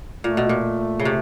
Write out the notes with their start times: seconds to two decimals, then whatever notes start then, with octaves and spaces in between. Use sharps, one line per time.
0.24 A#2 A3
0.37 B2
0.49 A#2
1.00 C#3
1.05 C3